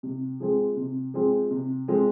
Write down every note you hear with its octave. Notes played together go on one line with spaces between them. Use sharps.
C3
F3 G#3 C4 G#4
C3
F3 G#3 C4 G#4
C3
F3 G#3 C4 G#4